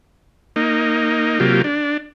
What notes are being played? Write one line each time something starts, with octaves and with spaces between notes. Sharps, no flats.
A#3 D#4
C3 F#3 A#3 F4 G4
D4